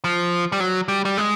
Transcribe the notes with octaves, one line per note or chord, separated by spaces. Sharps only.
F3
G3
F#3
G3
G3
G#3